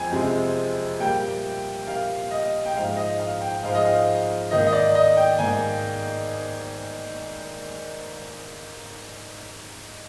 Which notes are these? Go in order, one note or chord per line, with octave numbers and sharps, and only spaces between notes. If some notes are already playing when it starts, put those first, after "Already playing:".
Already playing: F2 F3 G#3 G5 G#5
F2 C3 F3 G#3
A#2 G3 A#3 G5
A#2 G3 A#3 F5
D#5
G5
G#2 F3 G#3 F5
D#5
F5
G5
G#2 F3 G#3 F5
D#5
F5
G#2 D#3 A#3 D#5
D#5
D5
D#5
G5
G#2 D#3 A#3 G#5